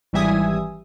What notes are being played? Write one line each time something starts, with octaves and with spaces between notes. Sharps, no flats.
G#1 E3 G3 E5 G#5 D#6